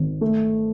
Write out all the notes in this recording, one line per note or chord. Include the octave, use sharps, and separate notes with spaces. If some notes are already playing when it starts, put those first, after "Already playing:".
Already playing: G#1
A3